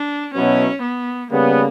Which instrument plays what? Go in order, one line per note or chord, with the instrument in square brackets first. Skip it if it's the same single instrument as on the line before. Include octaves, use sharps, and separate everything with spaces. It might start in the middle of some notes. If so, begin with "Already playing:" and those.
Already playing: [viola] D4
[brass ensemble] B2 F#3 B3 E4 B4 [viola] C#4
[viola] B3
[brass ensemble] C#3 G3 B3 [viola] A#3